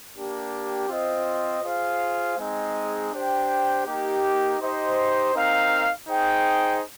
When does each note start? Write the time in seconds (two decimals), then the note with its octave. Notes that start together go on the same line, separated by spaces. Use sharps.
0.15 A#3 D4 G4
0.89 C4 F4 C5 D#5
1.63 F4 G#4 C5 F5
2.37 G#3 C4 D#4 G#4 D#5
3.12 D4 G4 C5 G5
3.86 A#3 D#4 G4
4.60 D#4 G4 C5 D#5
5.34 C4 D#4 A#4 F5
6.08 D#4 G#4 C5 G5